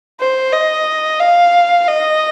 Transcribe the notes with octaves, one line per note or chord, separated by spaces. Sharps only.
C5
D#5
F5
D#5